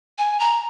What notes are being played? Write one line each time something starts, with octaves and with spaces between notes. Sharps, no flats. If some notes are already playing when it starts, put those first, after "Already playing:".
G#5
A#5